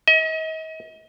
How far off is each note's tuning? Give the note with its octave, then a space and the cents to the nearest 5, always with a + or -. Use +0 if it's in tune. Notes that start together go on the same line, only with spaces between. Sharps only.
D#5 +40